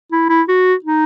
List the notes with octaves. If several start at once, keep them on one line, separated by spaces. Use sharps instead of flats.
E4
E4
F#4
D#4